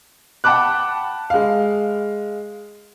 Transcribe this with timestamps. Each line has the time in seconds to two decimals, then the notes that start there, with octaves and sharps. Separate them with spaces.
0.44 F#5 G5 A5 B5 D6 F#6
1.30 G#3 F5